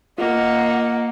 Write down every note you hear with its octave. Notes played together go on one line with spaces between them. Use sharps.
A#3 F4 D#5 F#5